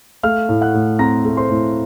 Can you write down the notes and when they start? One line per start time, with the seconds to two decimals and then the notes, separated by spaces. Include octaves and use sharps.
0.23 A3 F5 F6
0.49 A2
0.61 F#5 F#6
0.74 A2
0.99 C4 A#5 A#6
1.25 A3
1.37 C5 C6
1.50 A2